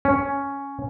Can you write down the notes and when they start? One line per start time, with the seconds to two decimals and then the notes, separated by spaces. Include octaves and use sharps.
0.05 C#4